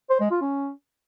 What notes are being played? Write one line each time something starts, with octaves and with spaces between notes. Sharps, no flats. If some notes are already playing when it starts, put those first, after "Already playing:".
C5
G#3
F4
C#4